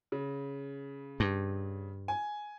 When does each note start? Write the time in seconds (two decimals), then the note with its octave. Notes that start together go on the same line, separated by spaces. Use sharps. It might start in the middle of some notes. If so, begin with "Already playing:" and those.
0.12 C#3
1.20 G2
2.08 G#5